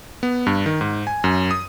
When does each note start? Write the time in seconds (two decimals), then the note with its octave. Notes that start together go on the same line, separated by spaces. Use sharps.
0.23 B3
0.47 G2
0.66 D#3
0.81 G#2
1.07 G#5
1.24 F#2
1.51 D#6